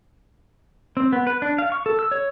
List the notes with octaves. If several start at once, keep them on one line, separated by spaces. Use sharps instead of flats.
C4
B3
B4
D4
F5
C#6
A4
E6
C#5